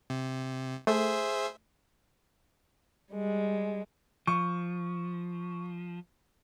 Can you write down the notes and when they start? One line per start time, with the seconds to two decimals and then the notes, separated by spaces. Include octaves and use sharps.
0.10 C3
0.87 A3 G#4 C5 E5
3.12 G3 G#3
4.27 F3 C#6